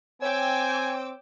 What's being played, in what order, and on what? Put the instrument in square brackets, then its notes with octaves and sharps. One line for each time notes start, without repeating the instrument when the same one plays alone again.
[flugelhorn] C4 [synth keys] C#5 [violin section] G5 D6 E6 [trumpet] G#5